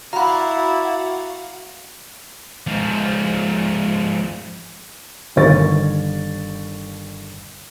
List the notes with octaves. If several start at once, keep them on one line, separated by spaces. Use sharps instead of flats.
E4 F#4 D5 F5 F#5 A#5 B5
G#2 F3
G1 D#2 C#5 A6